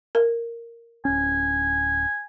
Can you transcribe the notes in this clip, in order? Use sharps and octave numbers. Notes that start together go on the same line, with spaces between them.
A#4
D1 C#4 G#5